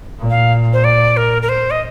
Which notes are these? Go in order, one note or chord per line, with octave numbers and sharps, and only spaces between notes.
A#2
F5
C5
D5
A#4
A#4
C5
D#5